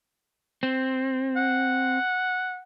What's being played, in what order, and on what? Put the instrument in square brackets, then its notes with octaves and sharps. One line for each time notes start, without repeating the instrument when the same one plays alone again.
[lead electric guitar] C4
[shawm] F#5